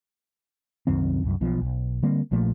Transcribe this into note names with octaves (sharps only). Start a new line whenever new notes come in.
C2 F#2 D#3 C4
C2 F#2
B1 B2 F3
B1
D3 G3 A#3 C4
A#1 A#2 F3 A3